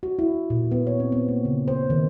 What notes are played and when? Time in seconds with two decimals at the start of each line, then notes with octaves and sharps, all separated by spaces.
0.03 F#4
0.19 E4
0.50 A#2
0.71 B3
0.87 C#5
1.00 C4
1.12 B3
1.28 A#3
1.45 C#3
1.68 C5
1.90 D#3